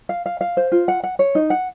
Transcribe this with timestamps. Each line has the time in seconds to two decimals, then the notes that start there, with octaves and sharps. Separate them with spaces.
0.09 F5
0.26 F5
0.41 F5
0.57 C5
0.72 F4
0.88 F#5
1.03 F#5
1.19 C#5
1.35 D#4
1.50 F#5